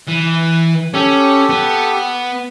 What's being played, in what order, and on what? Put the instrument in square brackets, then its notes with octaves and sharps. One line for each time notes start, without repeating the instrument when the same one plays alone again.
[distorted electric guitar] E3
[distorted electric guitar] C#4 [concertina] G4 A4
[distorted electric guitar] B3